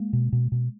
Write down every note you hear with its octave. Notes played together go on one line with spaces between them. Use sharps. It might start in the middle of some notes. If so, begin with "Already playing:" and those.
Already playing: G#3 A#3
B2
B2
B2